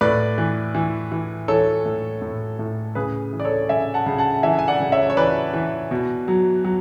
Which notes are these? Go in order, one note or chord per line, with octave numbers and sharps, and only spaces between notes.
A2 B4 D5
E3
E3
E3
E3 A4 C#5
A2
A2
A2
C#3 G#4 B4
E3
D5
A4 C#5
C#3 E5 G#5
F#5 A5
C#3
F#5 A5
E3 E5 G#5
G#5
D5 F#5
C#3
C#5 E5
C#5
E3 B4 D5
E3
B2
F#3
F#3